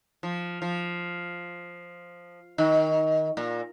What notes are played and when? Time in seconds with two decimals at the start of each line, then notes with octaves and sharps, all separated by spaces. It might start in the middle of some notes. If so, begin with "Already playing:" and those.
0.23 F3
0.62 F3
2.58 D#3
3.37 A#2